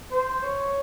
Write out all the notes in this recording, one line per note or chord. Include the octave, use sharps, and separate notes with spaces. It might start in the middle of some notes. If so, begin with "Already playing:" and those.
C5
C#5